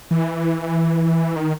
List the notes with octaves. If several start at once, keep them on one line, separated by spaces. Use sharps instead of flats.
E3
D#3